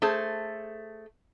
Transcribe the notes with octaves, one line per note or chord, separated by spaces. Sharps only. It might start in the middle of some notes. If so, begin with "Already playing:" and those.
A3 G#4 C5 A5